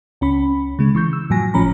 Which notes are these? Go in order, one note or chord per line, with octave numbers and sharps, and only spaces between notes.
C#2 C#4 B5
C#3 G#3
E3 C#6 G6
E6
F#2 A2 F3 F#3 G#5 A#6
G1 A2 F3 C#4 A#5 B5